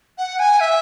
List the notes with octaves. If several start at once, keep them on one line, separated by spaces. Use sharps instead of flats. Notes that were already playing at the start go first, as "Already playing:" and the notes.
F#5
G#5
E5